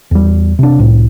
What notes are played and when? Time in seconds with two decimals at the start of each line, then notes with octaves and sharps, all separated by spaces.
0.11 E2 G3
0.59 C3 D4
0.79 C2 A2